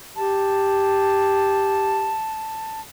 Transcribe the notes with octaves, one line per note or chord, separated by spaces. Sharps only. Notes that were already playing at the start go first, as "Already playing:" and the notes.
G4 A5